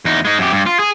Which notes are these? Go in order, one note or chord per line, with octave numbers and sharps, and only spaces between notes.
E2 D#4
G#3 D#4
F#2 G4
G2
F4
G#4